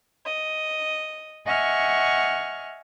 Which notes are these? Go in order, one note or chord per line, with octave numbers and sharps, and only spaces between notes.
D#5
D#5 E5 F#5 G#5 C#6 F6